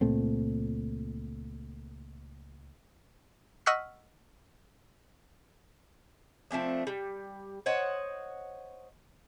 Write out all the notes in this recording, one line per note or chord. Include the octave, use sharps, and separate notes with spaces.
C#2 A#2 A3 C4
D#5 F#5 C#6 E6 F6 B6
F3 A3 C4 D4
G3
C5 C#5 D#5 F#5